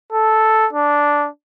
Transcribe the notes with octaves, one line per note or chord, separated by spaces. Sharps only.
A4
D4